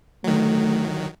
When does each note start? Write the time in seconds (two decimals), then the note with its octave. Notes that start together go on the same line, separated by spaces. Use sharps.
0.24 D#3 F#3 A3